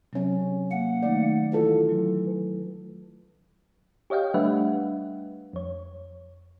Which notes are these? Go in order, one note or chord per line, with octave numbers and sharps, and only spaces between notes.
C3 F#3 C#4
A#3 F#5
D#3 A3 D#4 D5
E3 E4 F4 A4
F#3
G4 C#5 D#5 F5 G5
G3 A3 D4 B4 E5 F#5
F2 C#5